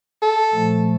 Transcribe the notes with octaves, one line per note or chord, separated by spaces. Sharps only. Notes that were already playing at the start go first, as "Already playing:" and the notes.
A4
A#2 F3 A3